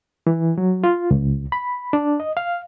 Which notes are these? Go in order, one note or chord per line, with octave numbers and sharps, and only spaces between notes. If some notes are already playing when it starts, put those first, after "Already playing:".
E3
F#3
F4
C#2
B5
D4
D#5
F5